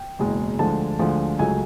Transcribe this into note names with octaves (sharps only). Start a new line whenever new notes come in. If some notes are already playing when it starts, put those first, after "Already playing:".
Already playing: G5
F#1 E2 B2 G#3
D2 D3 F3 G#3 A5
D2 D3 F3 G#3
C#2 C#3 F#3 A3 G#5